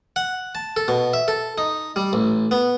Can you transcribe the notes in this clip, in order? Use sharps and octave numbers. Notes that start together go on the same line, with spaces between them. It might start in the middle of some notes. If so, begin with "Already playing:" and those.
F#5
A5
A4
B2
E5
A4
D#4
G3
A1
B3